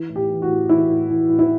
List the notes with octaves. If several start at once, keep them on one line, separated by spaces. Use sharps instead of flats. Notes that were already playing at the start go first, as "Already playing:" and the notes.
Already playing: E3
A2
G4
E3
F#4
A2
E3 E4
A2
E3
A2
E4